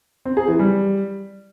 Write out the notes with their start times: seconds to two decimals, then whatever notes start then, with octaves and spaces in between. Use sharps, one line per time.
0.25 C4
0.37 G#4
0.48 E3
0.59 G3